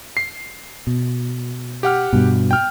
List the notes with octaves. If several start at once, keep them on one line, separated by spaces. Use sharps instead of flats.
C7
B2
G4 F#5 F6
G2 B2
G5 F6